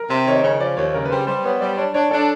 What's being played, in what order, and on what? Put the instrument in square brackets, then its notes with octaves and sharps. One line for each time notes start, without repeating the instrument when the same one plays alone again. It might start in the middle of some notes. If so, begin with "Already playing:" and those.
Already playing: [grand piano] A#4
[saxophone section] C3 [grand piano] C5
[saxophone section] D#3 [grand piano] C#5
[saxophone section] C#3 [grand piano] C#5
[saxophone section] F3 [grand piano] D5
[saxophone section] D#2 [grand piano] C#5
[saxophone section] C#3 [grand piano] A#4
[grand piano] B4
[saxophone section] G3 [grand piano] C5
[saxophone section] G3 [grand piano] C5
[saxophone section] B3 [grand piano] C#5
[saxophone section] G3 [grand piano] D5
[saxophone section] D4 [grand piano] C#5
[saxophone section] D4 [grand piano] C#5
[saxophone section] D4 [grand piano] A4